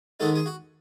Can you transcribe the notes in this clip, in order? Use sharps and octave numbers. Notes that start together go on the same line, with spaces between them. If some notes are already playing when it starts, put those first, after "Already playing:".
G#2 D#3 G#3 D#4 F#4 A4
G#4
F#4